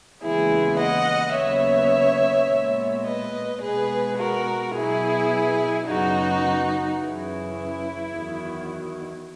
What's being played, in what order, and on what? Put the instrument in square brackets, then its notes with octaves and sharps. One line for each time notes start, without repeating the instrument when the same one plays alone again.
[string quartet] D#2 C#3 E3 G#3 B3 E4 G#4
D#5 F#5
D#2 C#3 F#3 B3 C#5 E5
A#2 G#3 B3
B4 D#5
B2 G#3 B3 G#4 B4
F#4 A#4
B2 F#3 B3 E4 G#4
F#2 C#3 F#3 B3 D#4 F#4
F#2 C#3 E3 E4
E2 D#3 F#3